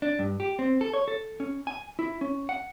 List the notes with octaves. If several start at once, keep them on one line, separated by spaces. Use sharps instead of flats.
D4
G2
G4
C4
A4
C#5
A4
C#4
G#5
E4
C#4
F#5